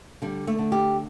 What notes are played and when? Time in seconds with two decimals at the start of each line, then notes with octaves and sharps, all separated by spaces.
0.22 D3 G3
0.47 A3
0.59 D3
0.72 G4